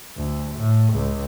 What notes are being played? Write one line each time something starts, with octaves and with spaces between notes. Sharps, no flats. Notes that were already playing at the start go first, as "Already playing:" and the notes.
D2
A2
C#2